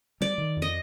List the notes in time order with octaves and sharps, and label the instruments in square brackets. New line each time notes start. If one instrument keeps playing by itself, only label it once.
[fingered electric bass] G3 [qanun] D5
[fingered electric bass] D#3
F2
[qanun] D#5